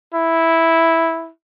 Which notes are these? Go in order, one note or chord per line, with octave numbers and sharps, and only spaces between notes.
E4